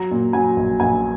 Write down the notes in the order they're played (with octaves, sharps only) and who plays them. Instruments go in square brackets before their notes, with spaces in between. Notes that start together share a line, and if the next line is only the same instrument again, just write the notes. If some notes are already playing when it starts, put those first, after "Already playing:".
Already playing: [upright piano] F#3 A#5
A#2
F#3 G#5
A#1
A#1 G#5